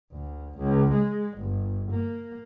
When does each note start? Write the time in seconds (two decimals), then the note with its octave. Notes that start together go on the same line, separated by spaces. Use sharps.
0.12 D2
0.58 C#2
0.92 G#3
1.38 G1
1.91 A#3